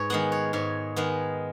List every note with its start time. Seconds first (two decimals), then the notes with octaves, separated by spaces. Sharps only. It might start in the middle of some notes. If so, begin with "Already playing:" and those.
Already playing: G#2 B4 C#5
0.10 D#3 G#3 B3 F#5
0.32 C#5
0.53 G#2 C#5
0.96 D#3 G#3 B3